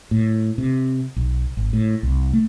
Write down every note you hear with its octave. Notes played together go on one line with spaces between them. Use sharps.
A2
C3
B1
G#1
A2
C2
A3